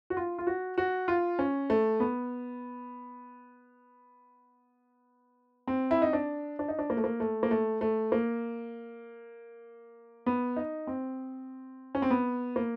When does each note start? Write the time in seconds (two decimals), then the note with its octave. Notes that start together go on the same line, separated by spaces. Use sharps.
0.10 F#4
0.17 F4
0.39 F4
0.47 F#4
0.78 F#4
1.08 F4
1.39 C#4
1.70 A3
2.00 B3
5.68 C4
5.91 E4
6.02 D#4
6.13 D4
6.59 D4
6.68 D#4
6.79 D4
6.90 A#3
6.97 A3
7.04 A#3
7.20 A3
7.43 A#3
7.51 A3
7.81 A3
8.12 A#3
10.26 B3
10.56 D#4
10.87 C4
11.95 C#4
12.02 C4
12.10 B3
12.56 A#3